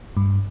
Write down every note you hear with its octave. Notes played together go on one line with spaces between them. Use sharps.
G2